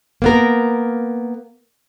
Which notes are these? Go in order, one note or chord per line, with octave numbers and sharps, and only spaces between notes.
A#3 B3 A#4